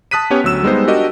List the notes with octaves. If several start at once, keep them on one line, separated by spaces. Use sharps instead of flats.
A5 D#6 F#6 B6 D#7
B3 C#4 G4 C#5
D2 F#3 E6 E7
G3 G#3 B3 D#4 C5
D4 F#4 G4 A#4 D#5